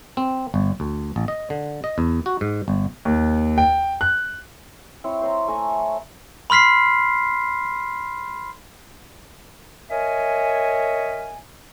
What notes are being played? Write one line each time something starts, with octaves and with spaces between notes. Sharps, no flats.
C4
G1
D2
A1
D#5
D3
D#5
E2
F#4
G#2
G1
D#2
G5
F#6
C4 E4 C#5
C5 C#5 A#5
A3 G#5 A#5
B5 C6 F6 B6 C7
A#4 C#5 D#5 E5 G#5